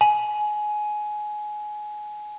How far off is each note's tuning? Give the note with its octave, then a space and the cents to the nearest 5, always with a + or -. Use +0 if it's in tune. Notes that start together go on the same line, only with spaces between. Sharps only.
G#5 +20